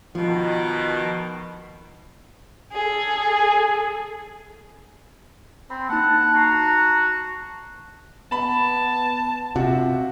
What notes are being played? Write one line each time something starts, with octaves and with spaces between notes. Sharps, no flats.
B2 D#3 F3
G#4 A4
C4 B5
A#3 D#4 F#5 A5
F#4 A5 A#5 C7
B3 A5 B5
C3 F4 F#4